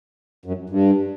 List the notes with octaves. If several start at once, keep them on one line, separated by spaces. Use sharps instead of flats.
F#2
G2